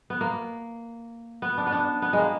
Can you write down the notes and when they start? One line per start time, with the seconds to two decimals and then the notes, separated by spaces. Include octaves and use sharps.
0.10 B3
0.21 A#3
1.42 B3
1.58 D4
1.67 B3
1.72 D4
2.02 B3
2.13 G#3
2.18 A#3